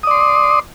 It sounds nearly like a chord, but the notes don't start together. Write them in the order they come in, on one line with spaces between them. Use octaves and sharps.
D#6 D5 C6